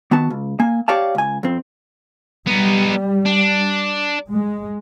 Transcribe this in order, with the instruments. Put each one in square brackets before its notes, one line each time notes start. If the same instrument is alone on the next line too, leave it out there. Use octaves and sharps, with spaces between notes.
[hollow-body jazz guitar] D#3 B3 F#4 A5
C#2
A#3 G#5
G4 C#5 D5 F5 A5
C#2 G#5
F2 C4
[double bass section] G3 [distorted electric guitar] B3 D#4
[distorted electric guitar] D4
[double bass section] G#3